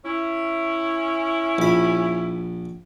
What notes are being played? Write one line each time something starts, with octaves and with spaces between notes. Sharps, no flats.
C#4 E4
A#1 B5